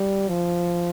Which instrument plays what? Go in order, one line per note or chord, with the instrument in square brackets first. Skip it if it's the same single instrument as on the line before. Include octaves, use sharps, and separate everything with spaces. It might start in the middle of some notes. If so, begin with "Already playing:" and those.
Already playing: [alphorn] G3
F3